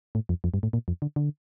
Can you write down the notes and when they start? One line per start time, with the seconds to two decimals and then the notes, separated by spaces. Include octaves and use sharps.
0.15 A2
0.29 F2
0.44 F2
0.54 G2
0.63 A2
0.73 A#2
0.88 F2
1.02 D3
1.16 D3